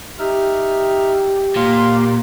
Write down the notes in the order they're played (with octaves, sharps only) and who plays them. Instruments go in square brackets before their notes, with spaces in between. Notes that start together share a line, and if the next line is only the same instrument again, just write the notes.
[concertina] D#4 E5 F6 [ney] G4
[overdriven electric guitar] A#2 [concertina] F5 C6